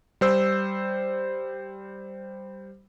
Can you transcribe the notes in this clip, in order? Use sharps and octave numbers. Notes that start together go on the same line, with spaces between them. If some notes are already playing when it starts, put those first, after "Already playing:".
G3 C5 E6